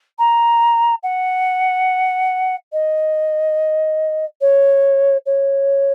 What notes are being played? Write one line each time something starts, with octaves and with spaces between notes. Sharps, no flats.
A#5
F#5
D#5
C#5
C#5